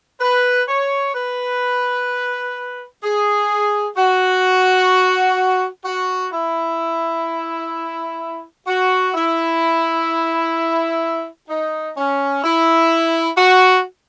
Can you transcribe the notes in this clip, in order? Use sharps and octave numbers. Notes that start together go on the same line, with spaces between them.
B4
C#5
B4
G#4
F#4
F#4
E4
F#4
E4
D#4
C#4
E4
F#4